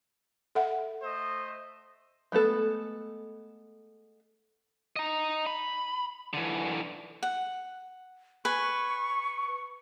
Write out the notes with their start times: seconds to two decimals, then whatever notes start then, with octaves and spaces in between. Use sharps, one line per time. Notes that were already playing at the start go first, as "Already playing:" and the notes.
0.55 A4 E5 F#5
1.02 A3 C5 D#5
2.32 G#3 A3 B3 A4
4.96 D#5 A#5
5.47 B5
6.33 D3 E3
7.23 F#5
8.45 B4 G#5 C#6